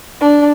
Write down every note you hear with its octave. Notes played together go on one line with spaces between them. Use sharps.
D4